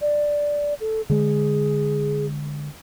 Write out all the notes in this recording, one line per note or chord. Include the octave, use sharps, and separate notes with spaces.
D5
A4
D3 G#3 G#4